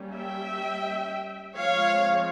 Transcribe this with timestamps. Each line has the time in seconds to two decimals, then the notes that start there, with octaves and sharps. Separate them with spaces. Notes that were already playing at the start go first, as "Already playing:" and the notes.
Already playing: G3 A#3 C#4
0.16 E5 G5
1.56 F3 G#3 C4 C#5 F5